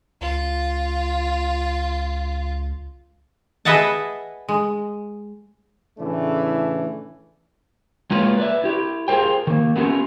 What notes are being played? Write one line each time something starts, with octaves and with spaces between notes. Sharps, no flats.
C#2 F4
G#4 B4 D#5 E5 F#5 A5
G#3
A2 C#3 E3 A3 D4
G#3 A#3 F4 B4 C#5
B4 D5 E5
E4 G4
F4 G#4 A#4 C5 G5
D#3 A#3
A3 B3 C#4 F4 G4 A#4